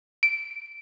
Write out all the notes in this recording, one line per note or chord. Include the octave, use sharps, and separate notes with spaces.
D7